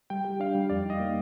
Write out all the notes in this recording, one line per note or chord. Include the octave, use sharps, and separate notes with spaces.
G3 G5
G4
D4 F5
G3
F2 D5
D#4 D#5
A#3